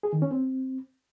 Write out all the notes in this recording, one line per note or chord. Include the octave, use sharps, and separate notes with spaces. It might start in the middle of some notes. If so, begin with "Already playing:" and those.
G#4
D#3
C#4
C4